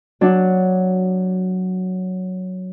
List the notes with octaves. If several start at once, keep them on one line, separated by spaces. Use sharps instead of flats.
F#3 D4